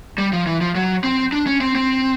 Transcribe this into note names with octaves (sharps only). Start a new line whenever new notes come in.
G3
F3
E3
F3
F#3
C4
D4
C#4
C4
C4